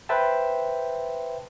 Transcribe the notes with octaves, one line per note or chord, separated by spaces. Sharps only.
B4 C5 E5 G5 A5